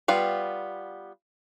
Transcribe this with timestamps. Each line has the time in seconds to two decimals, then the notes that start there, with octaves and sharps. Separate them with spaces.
0.08 G3 B3 F4